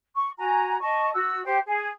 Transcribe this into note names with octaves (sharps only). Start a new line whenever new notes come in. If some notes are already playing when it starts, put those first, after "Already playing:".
C#6
F#4 G#5 A#5
D#5 A5 C#6
F#4 E6
G4 C5 G5
G#4